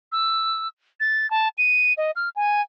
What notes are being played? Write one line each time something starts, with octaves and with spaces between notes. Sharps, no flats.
E6
A6
A5
D#7
D#5
F6
G#5